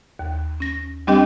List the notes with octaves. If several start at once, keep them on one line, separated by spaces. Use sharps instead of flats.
D#2
C#4 A#6
G3 C4 D4 G4 D#5 G5